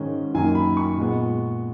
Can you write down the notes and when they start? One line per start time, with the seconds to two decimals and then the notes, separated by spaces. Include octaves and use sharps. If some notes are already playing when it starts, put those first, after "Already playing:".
Already playing: G#2 D#3 G#3 C#4
0.34 F#2 D#3 A#3 G#5
0.55 B5
0.77 C#6
0.97 A#2 G#3 B3